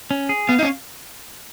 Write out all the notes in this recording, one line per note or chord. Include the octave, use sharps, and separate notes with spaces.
C#4
G#4
B3 F5
D#4
C#4